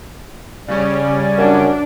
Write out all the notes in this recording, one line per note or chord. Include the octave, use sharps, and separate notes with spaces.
C#3 G3 C#4 D5
F#2 D4